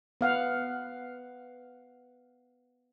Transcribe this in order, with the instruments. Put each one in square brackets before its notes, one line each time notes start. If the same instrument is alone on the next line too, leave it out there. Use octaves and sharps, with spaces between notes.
[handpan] B3 F5 F#5